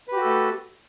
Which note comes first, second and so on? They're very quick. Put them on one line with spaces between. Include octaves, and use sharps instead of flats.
B4 G4 F#4 A4 A3